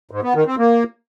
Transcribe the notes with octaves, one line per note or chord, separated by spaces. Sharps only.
G#2
B3
D#3
C4
A#3